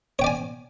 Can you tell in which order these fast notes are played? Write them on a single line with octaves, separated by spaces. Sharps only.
C#5 G5 D5 G#5